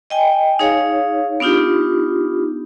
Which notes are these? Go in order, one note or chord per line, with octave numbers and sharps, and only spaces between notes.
D#5 G5 G#5
D#4 G#4 C#5 F5
B3 D4 D#4 F4 G4